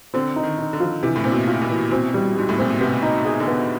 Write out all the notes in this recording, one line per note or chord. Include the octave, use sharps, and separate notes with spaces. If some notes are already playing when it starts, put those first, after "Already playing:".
D3 C4
D#4
D#3
D#4
D3
F3
C3 E3
A2
A#2 C4
B2
F4
A#2
E3
B2 C4
G3
G#2 G3
A2
A#2 C4
B2
C3 B3
D#4
G#4
D3
B3